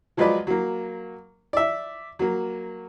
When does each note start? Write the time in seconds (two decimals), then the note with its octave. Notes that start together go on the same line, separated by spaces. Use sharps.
0.17 F3 F#3 G#3 F4 B4 D5
0.47 F#3 A#3
1.53 D5 E5
2.19 F#3 A#3